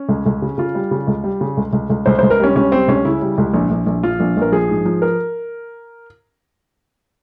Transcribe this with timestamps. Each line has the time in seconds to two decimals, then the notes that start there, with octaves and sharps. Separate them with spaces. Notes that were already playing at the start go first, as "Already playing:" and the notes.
Already playing: C#4
0.09 C#2
0.26 C#2
0.42 C#3
0.58 C#3 F4
0.75 G3
0.91 C#3
1.07 C#2
1.24 G3
1.41 C#3
1.57 C#2
1.73 C#2
1.90 C#2
2.06 C#2 C5
2.19 C#2 C5
2.30 A#4
2.40 G3 C#4
2.56 C#2 C#4
2.72 G3 C4
2.88 C#2 C#4
3.05 C#3 E4
3.22 G3
3.38 C#2
3.54 A#1
3.71 A#1
3.86 A#1
4.03 F3 F4
4.20 A#1
4.37 A#1 A#4
4.52 F3 G#4
4.70 G#2
4.85 F3
5.02 A#4